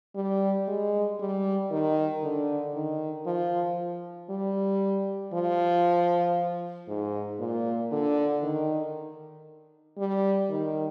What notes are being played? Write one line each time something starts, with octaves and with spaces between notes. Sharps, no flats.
G3
G#3
G3
D#3
D3
D#3
F3
G3
F3
G#2
A#2
D3
D#3
G3
D#3